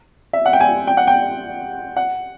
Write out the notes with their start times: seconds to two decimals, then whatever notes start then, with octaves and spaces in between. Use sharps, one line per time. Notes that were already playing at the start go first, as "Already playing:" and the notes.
0.33 E5
0.46 F#5
0.53 G5
0.61 G#5
0.87 G5
0.97 F#5
1.07 G5
1.97 F#5